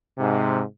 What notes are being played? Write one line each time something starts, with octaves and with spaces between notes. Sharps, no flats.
G#2 C3